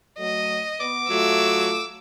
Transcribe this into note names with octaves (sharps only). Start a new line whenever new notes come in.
F#3 A3 D#5
B3 D6
F#3 A3 F4 E6